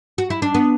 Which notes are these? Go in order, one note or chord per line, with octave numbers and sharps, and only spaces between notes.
F#4
E4
D4
B3